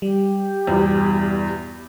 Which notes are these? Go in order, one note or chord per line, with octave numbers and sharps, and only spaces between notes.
G3 G4
E2 G2 B2